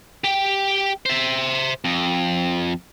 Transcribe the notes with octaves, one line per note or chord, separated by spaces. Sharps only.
G4 G5
C5 E5
F2